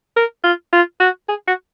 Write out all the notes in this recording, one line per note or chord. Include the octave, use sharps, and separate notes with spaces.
A#4
F4
F4
F#4
G#4
F#4